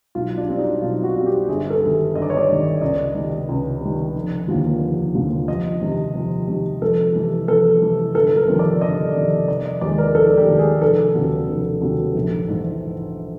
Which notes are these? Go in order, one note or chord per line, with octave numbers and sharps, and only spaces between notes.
B1 F4
D4
B2 G3 C4
D#4
B1 F4
F#4
B2 G3 C4
G4
G1 G#4
A4
G2 D#3
G1 D#5
D5
C#5
D5
G2 D#3
C#2 D#5
C3 D#3
C#2
C3 D#3
F1
D#2 D3 F3 A#3
F1
D#2 D3 F3 A#3
F2 D#5
C3 D#3
F2
C3 D#3
F2 A4
C3 E3
F2 A4
C3 E3
G1 A4
A#4
F2 C3 D#3
D5
G1 D#5
F2 C3 D#3
F1 D5
D#5
D#2 D#3 G#3 D5
A#4
F1 A4
G4
D#2 D#3 G#3
G#4
F1 A4
D#2 C#3 F#3 B3
F1
D#2 C#3 F#3 B3
A#1
G#2 E3